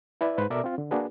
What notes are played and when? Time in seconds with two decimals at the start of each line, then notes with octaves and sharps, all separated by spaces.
0.21 E4 B4 D5 E5
0.38 G#2 B4 C5
0.50 B2 A4 A#4 D5 E5 D6
0.64 C4 F4
0.78 D3
0.91 A#3 D4 F#4 G#4 B4